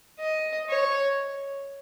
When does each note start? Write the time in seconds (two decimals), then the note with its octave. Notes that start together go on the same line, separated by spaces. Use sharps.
0.19 D#5
0.69 C#5